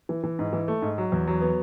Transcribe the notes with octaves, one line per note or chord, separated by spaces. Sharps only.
E3
E3
G#2
E3
A3
G#2
F#3
E2
F#3
B3